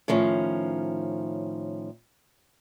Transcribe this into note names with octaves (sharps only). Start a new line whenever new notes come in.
A2 D#3 F3 C#4